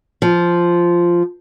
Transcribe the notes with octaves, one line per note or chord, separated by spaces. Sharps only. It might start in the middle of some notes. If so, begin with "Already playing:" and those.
F3